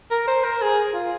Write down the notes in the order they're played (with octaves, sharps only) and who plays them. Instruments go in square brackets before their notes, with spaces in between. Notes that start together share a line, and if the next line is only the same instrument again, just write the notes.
[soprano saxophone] A#4
C5
A#4
G#4
F4